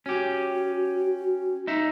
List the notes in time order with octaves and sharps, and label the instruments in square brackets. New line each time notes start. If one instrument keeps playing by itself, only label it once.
[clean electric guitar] C#4 G4 [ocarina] F#4
[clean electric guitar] D#4 E5